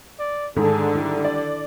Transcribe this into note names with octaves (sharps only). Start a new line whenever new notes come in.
D5
G#2 D3 D#3 G#4 A4
G3 E4
D5